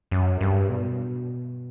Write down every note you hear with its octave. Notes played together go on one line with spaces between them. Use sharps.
F#2
G2
B2